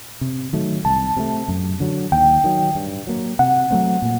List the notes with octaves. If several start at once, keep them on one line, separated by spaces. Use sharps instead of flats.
C3
D#3 F#3 A3
C2 A5
C3 D#3 A3
F#2
D3 F#3
D#2 G5
D#3 F#3
G2
F#3 A#3
C3 F#5
F#3 A3 C4
A#2